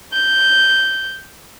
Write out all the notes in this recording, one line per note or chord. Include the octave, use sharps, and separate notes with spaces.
G6